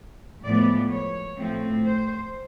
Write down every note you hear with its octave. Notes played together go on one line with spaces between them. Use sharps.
A2 F3 G#3 B3 D5
C#5
A2 F3 A3 C4
C5